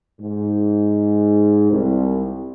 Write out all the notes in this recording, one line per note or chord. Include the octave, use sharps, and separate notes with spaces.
G#2
C2